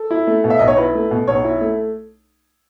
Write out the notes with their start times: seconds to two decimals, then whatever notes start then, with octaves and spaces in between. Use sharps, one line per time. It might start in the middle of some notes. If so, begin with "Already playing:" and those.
Already playing: A4
0.11 E4
0.27 A3
0.44 B2
0.50 E5
0.59 B1 D#5
0.68 C#5
0.77 E4 B4
0.95 A3
1.11 B2
1.27 B1 C#5
1.44 E4
1.61 A3